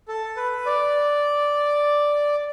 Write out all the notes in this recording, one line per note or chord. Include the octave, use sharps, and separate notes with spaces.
A4
B4
D5